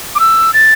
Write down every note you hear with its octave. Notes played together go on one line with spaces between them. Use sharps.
D6
E6
A6